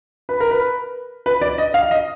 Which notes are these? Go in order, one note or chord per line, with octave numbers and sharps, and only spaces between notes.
B4
A#4
B4
B4
D5
D#5
F5
D#5